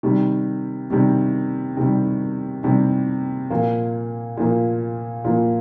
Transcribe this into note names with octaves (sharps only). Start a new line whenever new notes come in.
C3 D#3 G3
C3 D#3 G3
C3 D#3 G3
C3 D#3 G3
A#2 F3 A#3
A#2 F3 A#3
A#2 F3 A#3